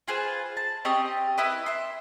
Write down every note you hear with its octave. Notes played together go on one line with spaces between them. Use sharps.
F4 G#4 B4 C5
A5
C4 C#4 G4 D#5
E4 B4 D#5
E5 C6